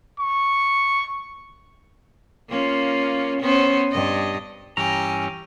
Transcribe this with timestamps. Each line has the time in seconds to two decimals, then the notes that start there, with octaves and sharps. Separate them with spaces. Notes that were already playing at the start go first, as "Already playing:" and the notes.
0.19 C#6
2.49 A#3 C#4 F4
3.41 B3 C#4 C5
3.92 G2 D#5
4.77 G2 E3 C#4 G4 G#5 A#5